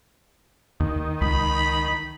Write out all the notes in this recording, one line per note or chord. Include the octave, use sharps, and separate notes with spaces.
D#2 D#3
C#2 B5